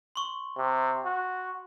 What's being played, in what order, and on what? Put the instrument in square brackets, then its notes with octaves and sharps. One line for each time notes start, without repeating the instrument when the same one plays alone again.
[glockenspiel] C6 C#6
[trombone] C3
F#4